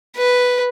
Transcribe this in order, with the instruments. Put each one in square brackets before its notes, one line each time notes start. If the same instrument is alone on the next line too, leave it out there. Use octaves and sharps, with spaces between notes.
[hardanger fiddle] B4